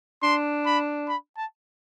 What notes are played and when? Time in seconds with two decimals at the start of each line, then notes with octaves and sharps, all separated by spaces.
0.23 D4 C6
0.66 B5
1.08 B5
1.37 A5